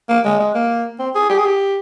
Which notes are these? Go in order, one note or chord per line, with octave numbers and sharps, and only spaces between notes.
A#3
G#3
G#3
A#3
C4
G#4
G4
G#4
G4